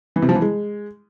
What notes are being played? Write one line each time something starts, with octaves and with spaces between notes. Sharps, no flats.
E3
C3
F3
E3
G#3